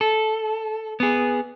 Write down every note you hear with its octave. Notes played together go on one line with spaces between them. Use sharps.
A4
B3 G#4